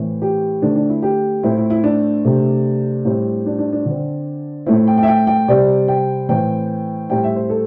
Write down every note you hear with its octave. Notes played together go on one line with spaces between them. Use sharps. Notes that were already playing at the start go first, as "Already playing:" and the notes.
Already playing: A2 E3 C4
G4
D3 A3 C4 D4
D4
E4
G4
A2 A3 C4 E4
E4
E4
D4
C3 A3 C4
A2 G3 C4
D4
D4
D4
D3 C4
A2 A3 C4 E4
E4
G5
G5
E5
G5
G5
C3 G3 C4 D5
G5
A2 E3 C4 G5
A2 G3 C4 G5
E5
C5
A4